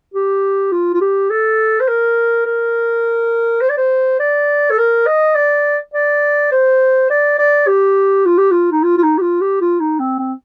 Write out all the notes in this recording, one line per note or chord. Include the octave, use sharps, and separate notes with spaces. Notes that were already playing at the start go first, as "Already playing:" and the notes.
G4
F4
F4
G4
A4
C5
A#4
A#4
C5
D5
C5
D5
A4
A#4
D#5
D5
D5
C5
D5
D5
G4
F4
G4
F4
D#4
F4
F4
D#4
G4
F4
G4
F4
D#4
C4
C4